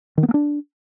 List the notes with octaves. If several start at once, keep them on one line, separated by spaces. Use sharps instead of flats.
D#3
B3
A#3
D4